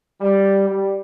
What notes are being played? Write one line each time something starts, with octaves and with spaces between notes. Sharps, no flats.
G3
G3